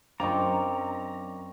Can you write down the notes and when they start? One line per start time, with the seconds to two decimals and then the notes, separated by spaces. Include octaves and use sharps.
0.20 F#2 C4 D4 F4 D#5 A#5 C#6 D6